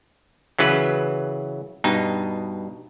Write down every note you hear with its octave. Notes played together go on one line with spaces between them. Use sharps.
C#3 E3 F#3 B4
G2 B2 D#4